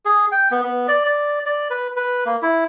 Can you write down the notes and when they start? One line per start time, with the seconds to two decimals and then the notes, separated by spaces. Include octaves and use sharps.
0.05 G#4
0.32 G5
0.51 B3
0.64 B3
0.88 D5
1.05 D5
1.46 D5
1.70 B4
1.96 B4
2.26 A#3
2.42 E4